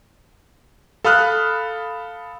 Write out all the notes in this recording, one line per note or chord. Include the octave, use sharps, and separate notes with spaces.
A4 F5 B5 D#6 F6 F#6